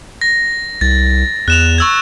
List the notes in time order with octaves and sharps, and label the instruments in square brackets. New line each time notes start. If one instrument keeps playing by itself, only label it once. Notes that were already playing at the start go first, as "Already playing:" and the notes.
[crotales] A#6
[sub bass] C2 [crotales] A6
[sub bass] E2 [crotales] F#6 E7 F7
[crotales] C#6 E6 G#6